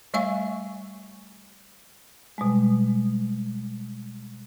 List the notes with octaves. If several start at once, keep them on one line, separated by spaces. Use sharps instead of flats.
G3 A3 E5 F5 G#5 C#6
B2 G3 G#3